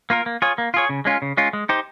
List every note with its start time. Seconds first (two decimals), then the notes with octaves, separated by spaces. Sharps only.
0.10 A#3 F4 A#4
0.26 A#3
0.42 F4 G#4 C#5
0.58 A#3
0.74 F4 G#4 C#5
0.89 C#3
1.05 G#3 C#4 F4
1.22 C#3
1.37 G#3 C#4 F4
1.53 G#3
1.69 D#4 G4 C5